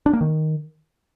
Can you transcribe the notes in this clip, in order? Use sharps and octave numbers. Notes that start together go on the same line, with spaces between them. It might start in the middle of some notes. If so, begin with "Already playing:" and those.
D4
A#3
D#3